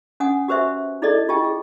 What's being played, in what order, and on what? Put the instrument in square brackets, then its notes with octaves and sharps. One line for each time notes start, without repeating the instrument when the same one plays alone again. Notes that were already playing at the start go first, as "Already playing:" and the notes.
[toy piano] C#4 F#5 G#5 D#6
F#4 G4 B4 C5 E5
D#4 E4 G#4 A4 D5 D#5
E4 F4 G4 D#5 G5 A5
G#4